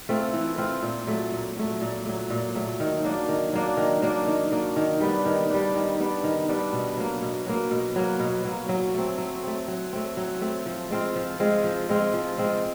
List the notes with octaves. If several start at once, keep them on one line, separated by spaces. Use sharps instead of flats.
A3 C4 F4
E3
A3 C4 F4
A#2
F#3 A3
A#2
F#3 A3
A#2
F#3 A3
A#2
F#3 A3
D#3
F#3 A#3 D4
D#3
F#3 A#3 D4
D#3
F#3 A#3 D4
D#3
F#3 A#3 D4
D#3
G3 B3 D4
D#3
G3 B3 D4
D#3
G3 B3 D4
D#3
G3 B3 D4
B2
F#3 A#3
B2
F#3 A#3
B2
F#3 A#3
B2
F#3 A#3
F#3
A3 C4
F#3
A3 C4
F#3
A3 C4
F#3
A3 C4
F3
G#3 C4 F4
F3
G#3 C4 F4
F3
G#3 C4 F4
F3
G#3 C4 F4